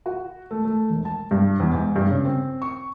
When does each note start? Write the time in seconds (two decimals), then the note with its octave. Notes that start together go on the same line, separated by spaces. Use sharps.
0.06 F#4
0.51 A3
0.65 A3
0.89 E1
1.05 A5
1.31 G2
1.60 E2
1.73 G#2
1.96 G2
2.10 C#3
2.25 C4
2.62 C#6